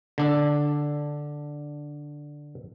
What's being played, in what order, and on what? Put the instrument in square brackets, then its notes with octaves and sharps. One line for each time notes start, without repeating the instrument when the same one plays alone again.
[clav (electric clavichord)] D3 D4 A4